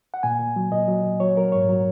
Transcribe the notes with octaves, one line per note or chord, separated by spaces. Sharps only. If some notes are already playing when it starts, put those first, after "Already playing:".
F#5
A#2 G#5
A#2
F#3
A#2 D#5
F#3
A#2
F#3 C#5
F#3 A#4
G#2 C#5
F#3